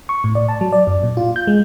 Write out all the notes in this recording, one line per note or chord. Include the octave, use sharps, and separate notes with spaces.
C#6
A2
D5
A5
F#3
D5
F#2
A#2
F4
G6
G#3